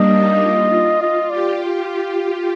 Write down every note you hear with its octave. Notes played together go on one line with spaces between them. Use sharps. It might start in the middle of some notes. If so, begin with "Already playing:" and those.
Already playing: G3 A#3 D4 D#5
D#4
F4
F4 D#5
G4 D5